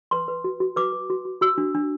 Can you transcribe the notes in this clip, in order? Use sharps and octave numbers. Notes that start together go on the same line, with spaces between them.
B4 C6
B4
F#4
F#4
B4 D6
B4
F#4
F#4
F#4 E6
D4
D4